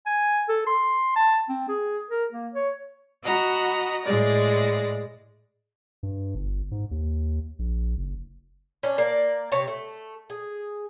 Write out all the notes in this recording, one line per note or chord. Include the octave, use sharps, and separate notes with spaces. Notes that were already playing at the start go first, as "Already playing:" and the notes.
G#5
A4
C6
A5
C4
G#4
A#4
A#3
C#5
F#4 D#5 A#5 B5
A2 G#3 D5 A#6
G2
G1
G#2
D#2
A#1
F#1
C#4 D4
A#3 D5
C3 C#5 A5
A3
G#4